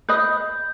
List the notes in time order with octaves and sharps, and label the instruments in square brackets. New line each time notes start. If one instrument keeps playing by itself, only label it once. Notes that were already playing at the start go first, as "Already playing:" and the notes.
[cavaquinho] B4 D#5 [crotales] G6